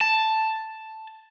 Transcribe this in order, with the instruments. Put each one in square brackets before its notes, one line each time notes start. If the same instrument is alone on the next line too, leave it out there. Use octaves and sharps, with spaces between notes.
[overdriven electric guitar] A5